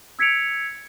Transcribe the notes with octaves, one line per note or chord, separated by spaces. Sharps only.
E6 G#6 B6 C#7 D7 F7